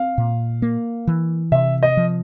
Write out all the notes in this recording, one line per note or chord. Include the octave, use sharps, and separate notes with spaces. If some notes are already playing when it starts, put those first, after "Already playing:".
Already playing: C4 F5
A#2
A#3
E3
C3 E5
D#5
F3